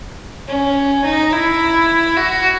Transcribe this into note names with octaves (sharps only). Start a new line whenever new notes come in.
C#4
D#4
E4
F#4